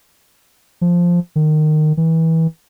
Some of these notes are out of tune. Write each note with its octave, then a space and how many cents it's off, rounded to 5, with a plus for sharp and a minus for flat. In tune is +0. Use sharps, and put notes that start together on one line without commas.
F3 +0
D#3 -20
E3 -25